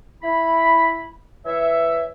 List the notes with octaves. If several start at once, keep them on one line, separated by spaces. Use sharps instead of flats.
E4 B5
E3 C#5 E5